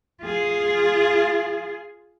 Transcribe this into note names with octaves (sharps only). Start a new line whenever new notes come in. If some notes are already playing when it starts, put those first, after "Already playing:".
F4 G#4